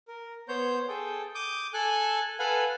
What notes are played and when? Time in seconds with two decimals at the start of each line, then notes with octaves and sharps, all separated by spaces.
0.08 A#4
0.48 B3 C5 C#5 G6
0.88 G#4 A4 G5
1.35 D6 D#6 G6
1.74 A4 G#5 F#6
2.39 A4 B4 F5 F#5 G#5